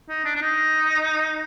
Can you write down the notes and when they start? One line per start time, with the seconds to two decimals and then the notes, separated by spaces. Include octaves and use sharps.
0.09 D#4
0.25 D4
0.35 D4
0.41 D#4